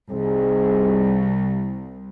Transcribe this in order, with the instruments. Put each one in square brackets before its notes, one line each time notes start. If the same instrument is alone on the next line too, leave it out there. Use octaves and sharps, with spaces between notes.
[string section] C2 [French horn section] C4 D#4 G#4